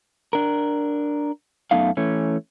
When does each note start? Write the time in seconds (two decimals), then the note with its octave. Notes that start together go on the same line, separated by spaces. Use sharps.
0.33 D4 A#4
1.71 F#2 A3 B3 D#4 F5
1.97 E3 A3 C#4